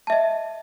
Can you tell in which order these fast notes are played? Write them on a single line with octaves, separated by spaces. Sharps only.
A5 E5 D#5